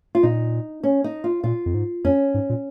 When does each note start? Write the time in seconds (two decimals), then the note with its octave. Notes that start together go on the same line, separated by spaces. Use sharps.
0.15 F4
0.23 A#2 D#4
0.83 C#4
1.04 D#4
1.24 F4
1.44 A#2 F4
1.66 F2
1.74 G#2
2.04 F2 C#4
2.34 G#2
2.50 A#2